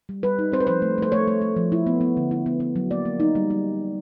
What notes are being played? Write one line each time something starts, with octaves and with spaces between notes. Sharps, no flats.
G3
G3 B4
D#4
C4 C5
B4
F3 C5
A3
A3 C5
A3 C#5
A3
A3
F3
E4
B3
B3
D3
E4
B3
B3
F#3
A#3 D5
A#3
D#4
G3
G3